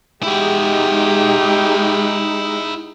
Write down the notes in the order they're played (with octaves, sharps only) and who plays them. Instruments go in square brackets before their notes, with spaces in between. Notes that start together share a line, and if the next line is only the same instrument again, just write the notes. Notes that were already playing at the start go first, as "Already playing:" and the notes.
[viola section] G#3 D#4 [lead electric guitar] E4 F#4 [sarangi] G4